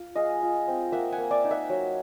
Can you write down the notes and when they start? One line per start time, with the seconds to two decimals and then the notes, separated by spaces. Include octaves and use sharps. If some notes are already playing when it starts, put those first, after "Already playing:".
Already playing: F4
0.16 G#3 D#5 F5
0.42 F4
0.68 C4
0.92 A#3 E5 F#5
1.12 F#5 G#5
1.18 A#3
1.31 D5 E5
1.44 D#4
1.51 E5 F#5
1.70 F#3